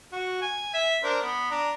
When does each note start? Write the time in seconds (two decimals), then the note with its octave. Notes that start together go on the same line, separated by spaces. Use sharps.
0.12 F#4
0.42 G#5
0.74 E5
1.03 D4 A#4 C5
1.22 B3
1.51 D4 A#5